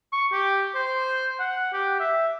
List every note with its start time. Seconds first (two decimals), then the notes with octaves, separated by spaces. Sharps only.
0.12 C#6
0.33 G4
0.75 C5
1.39 F#5
1.73 G4
2.00 E5